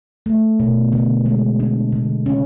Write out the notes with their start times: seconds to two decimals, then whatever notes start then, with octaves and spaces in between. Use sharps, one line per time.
0.26 A3
0.60 B2
0.92 D3
1.26 G#3
1.60 D4
1.92 D3
2.26 C#4